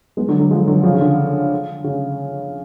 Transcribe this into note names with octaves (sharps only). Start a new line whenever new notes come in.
G#3 B3
D3 F#3
D3 F#3
F3 G#3
D3 F#3
C#3 F3
C#3
D3
C#3